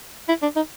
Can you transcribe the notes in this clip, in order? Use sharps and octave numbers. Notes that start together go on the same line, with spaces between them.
E4
D4
D#4